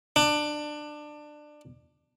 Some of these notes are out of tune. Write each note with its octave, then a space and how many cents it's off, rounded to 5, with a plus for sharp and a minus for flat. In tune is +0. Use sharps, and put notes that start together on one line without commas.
D4 +20